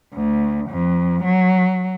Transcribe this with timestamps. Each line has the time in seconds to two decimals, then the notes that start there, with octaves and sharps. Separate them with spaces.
0.14 D2
0.70 F2
1.24 F#3